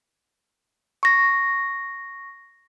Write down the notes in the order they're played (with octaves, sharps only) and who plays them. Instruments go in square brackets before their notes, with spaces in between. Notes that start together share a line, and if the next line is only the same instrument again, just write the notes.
[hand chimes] C#6 A#6